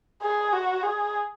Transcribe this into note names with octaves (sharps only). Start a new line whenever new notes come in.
G#4
F#4
G#4